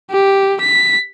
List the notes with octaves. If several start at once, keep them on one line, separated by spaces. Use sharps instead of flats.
G4
B6